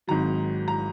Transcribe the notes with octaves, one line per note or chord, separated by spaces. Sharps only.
G#1 G#2 D#3 F#3 A#5
A#5